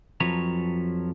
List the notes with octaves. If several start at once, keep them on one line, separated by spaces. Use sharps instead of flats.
F2 F3 F#3 B4 C#5 A#5